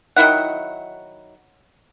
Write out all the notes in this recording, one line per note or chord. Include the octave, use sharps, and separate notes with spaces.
D#3 F#3 E4 F#5